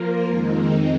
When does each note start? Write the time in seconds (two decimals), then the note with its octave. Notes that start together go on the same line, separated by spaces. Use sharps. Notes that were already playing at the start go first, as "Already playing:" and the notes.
Already playing: F3 A#3 F4 A#4
0.24 F2 D#3 G#3 C4 D#4